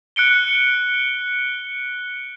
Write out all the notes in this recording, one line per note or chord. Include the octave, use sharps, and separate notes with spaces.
F#6 C#7 D7 G7